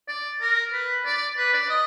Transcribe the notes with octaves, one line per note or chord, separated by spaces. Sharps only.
D5
A#4
B4
D5
B4
D5
D#5